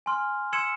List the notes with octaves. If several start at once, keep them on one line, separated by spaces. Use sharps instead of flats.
G#5 C6 F6
C6 E6 G#6 C#7 E7